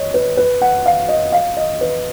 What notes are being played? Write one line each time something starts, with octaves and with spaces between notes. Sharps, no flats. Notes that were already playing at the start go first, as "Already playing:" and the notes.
Already playing: C#5 D#5
B4
B4
F#5
F5
D#5
F5
D#5
B4